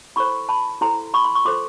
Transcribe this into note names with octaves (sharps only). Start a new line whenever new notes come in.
E4 A4 C5 B5 C#6
A5 B5
E4 A4 C5 A#5 C6
B5 C#6
C6
C#6
F4 A4 C5 C6 D6